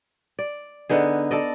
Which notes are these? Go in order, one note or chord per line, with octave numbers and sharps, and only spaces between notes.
D5
D3 B3 D#4 G#4
A4 D5 D#5